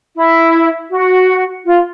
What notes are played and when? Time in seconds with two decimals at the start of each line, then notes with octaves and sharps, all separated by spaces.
0.15 E4
0.90 F#4
1.65 F4